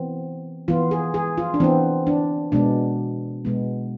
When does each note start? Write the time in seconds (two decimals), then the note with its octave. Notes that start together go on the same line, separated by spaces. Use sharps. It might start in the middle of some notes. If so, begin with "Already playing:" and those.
Already playing: E3 B3 C4
0.68 E3 B3 F4
0.91 G#4
1.14 G#4
1.38 F4
1.54 D4
1.60 E3 B3 C4
2.07 D4
2.52 B2 G#3 B3 D4
3.45 B2 G#3 B3